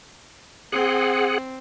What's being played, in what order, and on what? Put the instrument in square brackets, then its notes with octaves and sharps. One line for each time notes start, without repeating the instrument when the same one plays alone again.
[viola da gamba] C4 [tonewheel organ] G#4 F#5